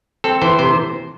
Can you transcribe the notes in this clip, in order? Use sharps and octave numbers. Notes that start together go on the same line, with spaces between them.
C4 A4
E3 C5
C3 C5